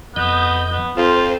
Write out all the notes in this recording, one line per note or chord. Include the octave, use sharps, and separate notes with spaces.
F2 B3 D#5 G6
B3
F2 F4 C5